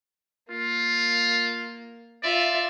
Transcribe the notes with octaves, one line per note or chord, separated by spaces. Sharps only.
A#3 F4
F4 D5 E5